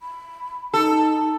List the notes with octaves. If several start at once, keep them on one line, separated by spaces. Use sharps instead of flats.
B5
D#4 A4